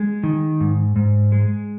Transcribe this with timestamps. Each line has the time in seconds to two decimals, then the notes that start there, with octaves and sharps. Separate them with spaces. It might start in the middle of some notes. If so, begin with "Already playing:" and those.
Already playing: G#3
0.23 D#3
0.60 G#2
0.96 G#2
1.32 G#3